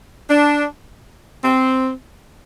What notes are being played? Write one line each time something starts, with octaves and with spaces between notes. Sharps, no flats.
D4
C4